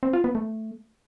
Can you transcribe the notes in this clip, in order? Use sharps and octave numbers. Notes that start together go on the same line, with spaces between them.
C4
F4
B3
A3